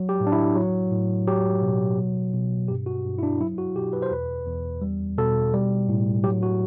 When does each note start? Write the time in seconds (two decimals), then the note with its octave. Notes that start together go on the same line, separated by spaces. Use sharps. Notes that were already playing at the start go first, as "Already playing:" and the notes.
Already playing: F#3
0.09 G4
0.20 A2
0.27 D4
0.32 E4
0.55 F#3
0.91 A2
1.27 F#3 G4
1.62 B2
1.98 F#3
2.34 B2
2.68 G2 G4
2.86 F#4
3.05 G2
3.19 E4
3.23 D4
3.41 F#3 E4
3.58 F#4
3.76 B2 G4
3.93 B4
4.02 C5
4.11 E2 B4
4.46 E2
4.82 G3
5.18 B2 A4
5.53 G3
5.88 A2
6.24 F#3 G4
6.43 F#4